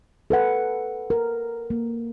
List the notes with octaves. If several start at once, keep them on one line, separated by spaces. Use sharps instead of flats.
A4 B4 F#5
A#4
A#3